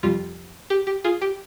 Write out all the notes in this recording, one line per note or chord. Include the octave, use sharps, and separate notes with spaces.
F2 C3 G3 F4
G4
G4
F4 G#4
G4